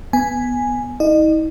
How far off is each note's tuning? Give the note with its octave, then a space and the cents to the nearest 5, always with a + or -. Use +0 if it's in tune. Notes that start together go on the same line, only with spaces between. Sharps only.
B3 +0 G#5 +0
D#4 +45 D#5 -35